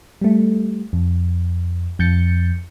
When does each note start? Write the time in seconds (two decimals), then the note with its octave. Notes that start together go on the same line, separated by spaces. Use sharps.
0.21 G3 A3
0.93 F2
1.99 F2 G6 A6 C#7